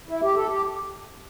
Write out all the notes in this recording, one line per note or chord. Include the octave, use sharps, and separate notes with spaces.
E4
G4
A4
G4